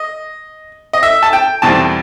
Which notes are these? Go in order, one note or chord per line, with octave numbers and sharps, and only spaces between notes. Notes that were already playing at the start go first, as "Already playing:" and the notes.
Already playing: D#5
D#5
E5
A5
G5
E2 B2 G3 C4 A5